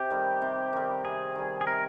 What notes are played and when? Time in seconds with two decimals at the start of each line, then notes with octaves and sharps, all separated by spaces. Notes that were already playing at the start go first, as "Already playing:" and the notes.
Already playing: C3 G4
0.10 D#3 G3
0.42 C3
0.73 D#3 G3
1.04 C3 G#4
1.35 D#3 G3
1.61 G#4
1.67 C3 A#4